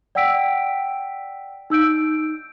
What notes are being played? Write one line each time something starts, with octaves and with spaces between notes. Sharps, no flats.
D5 F#5 G5 E6 B6 D7
D#4 E6 G6 D7